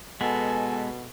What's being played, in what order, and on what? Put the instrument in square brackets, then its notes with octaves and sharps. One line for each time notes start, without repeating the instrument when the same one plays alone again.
[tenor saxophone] B2 [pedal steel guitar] G#3 B3 [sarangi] A4 [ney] G#5